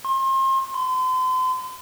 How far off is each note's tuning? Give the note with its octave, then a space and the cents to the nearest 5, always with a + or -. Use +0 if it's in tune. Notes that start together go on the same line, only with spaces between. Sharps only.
C6 +35
C6 -40